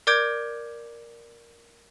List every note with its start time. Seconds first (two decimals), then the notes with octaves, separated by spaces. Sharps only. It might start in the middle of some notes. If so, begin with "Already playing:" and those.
0.07 A#4 D5 D6 G6 G#6 D7